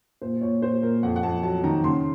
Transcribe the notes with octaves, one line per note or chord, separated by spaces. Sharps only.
A#2 C5
A#2 C#5
A#2 C5
A#2 A#4
F2 F#5
F#5
F2 A5
F#3 A5
D#3 A#5
C#3 C6